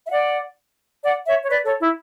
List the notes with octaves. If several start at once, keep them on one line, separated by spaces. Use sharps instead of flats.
E5
D5 F#5
D5 F#5
C#5 E5
C#5
B4 D5
A4 C#5
E4